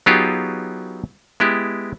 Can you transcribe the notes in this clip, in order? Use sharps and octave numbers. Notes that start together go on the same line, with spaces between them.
F#3 B3 D#4 F4 G4 G#4
G#3 B3 E4 G4